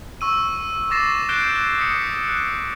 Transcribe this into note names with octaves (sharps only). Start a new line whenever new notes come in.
C#6 E6 D#7
C#6 D6 A6 A#6 C7 E7
F#6 G6 C7 D7 E7 G7
D#6 B6 C#7
F#6